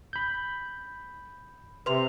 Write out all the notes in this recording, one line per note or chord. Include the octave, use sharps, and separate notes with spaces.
B5 G6
C3 B4 C6 F7